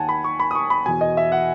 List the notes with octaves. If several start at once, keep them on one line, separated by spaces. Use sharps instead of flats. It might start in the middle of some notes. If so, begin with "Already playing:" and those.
Already playing: D#2 D#3 F#5 G#5 A5
B5
C#6
B5
D#6
C#6
B5
E2 B2 G#5
D#5
E5
F#5